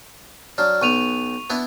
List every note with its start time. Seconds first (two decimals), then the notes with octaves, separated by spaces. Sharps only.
0.58 F#3 D4 D5 F6
0.81 B1 B3 C#6 D#7 F7
1.50 B3 D4 E4